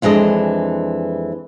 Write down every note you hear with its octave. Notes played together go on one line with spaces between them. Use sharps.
F2 E3 G#3 D4 D#5